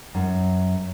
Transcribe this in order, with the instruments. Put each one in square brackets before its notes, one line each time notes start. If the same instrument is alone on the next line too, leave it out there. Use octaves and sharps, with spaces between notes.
[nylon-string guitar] F#2